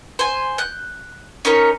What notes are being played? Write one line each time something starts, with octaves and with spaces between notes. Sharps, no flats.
C5 G#5
F#6 G6
C#4 D#4 A#4 C#5